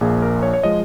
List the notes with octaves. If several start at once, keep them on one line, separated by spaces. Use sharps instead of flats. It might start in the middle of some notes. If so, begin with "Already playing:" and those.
A#1 A#2 F3 G#4
A#4
C#5
C#5
F3 G#3 D#5